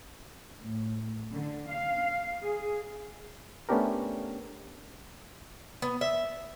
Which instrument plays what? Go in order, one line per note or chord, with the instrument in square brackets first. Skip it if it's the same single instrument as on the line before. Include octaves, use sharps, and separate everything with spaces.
[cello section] A2
D3
F5
G#4
[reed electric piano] A3 B3 C#4 D4 G4 A#4
[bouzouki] B3
E5